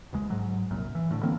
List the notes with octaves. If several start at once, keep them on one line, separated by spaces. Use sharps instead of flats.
D#1 C#2 G#3
G#2 F#3
F1 C2 F#2 A#2
E3
A2 D3
D3 E3 A#3 C4